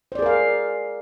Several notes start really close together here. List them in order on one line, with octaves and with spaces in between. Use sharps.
C5 D5 G#4 A#4 F5